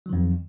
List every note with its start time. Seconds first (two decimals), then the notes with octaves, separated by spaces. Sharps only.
0.06 F#3
0.09 D#3
0.13 F2